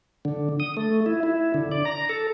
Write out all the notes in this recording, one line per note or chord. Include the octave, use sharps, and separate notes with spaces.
D3
D#6
A3
E4
E4
D3
D5
A#5
A4